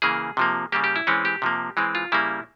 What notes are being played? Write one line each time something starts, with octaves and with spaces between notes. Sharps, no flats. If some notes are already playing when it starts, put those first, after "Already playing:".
C#3 E3 A#3 G#4
C3 F3 A#3
C#3 G3 A#3 G4
G4
E4
E3 G#3 C4 C#4
G4
C3 F3 A#3
E3 G#3 C4
F4
C#3 G3 A#3 E4